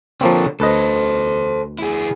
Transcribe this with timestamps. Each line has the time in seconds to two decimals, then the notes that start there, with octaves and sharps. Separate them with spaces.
0.21 D3 F3 A#3 C4 C#5
0.60 D2 A4 B4 C5 D#5
1.79 E4 G#4